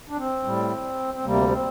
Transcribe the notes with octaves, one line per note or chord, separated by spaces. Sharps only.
D4
C4
A2 G3
C4
D2 C3 G3 A#3
C4